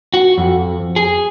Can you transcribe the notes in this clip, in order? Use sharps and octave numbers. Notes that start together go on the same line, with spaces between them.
F#4
F2
G#4